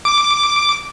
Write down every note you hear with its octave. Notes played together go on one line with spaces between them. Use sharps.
D6